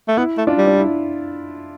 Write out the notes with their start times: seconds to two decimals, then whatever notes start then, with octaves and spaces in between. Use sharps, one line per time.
0.08 A3
0.17 B3 E4
0.37 A3
0.47 D4 F4
0.58 G3
0.67 D4
0.78 E4